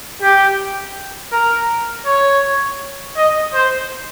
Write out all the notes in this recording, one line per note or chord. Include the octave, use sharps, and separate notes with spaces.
G4
A#4
C#5
D#5
C5